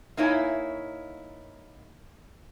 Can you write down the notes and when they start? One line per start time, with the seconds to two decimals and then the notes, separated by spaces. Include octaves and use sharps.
0.17 A#3 D#4 E4 C#5 G#5